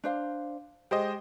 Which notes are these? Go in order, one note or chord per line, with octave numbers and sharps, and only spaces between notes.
D4 C5 F5
G#3 G4 C5 D#5